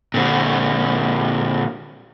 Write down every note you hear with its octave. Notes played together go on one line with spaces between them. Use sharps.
A#2 D3